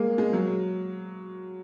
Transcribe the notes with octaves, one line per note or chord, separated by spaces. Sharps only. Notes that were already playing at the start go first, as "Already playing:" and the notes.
Already playing: G#3 A#3
G#3
F#3